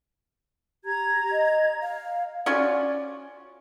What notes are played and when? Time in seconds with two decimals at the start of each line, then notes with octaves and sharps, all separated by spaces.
0.84 G4 A#5 G#6
1.31 D#5
1.81 F5
2.46 C#4 F4 F#4 D5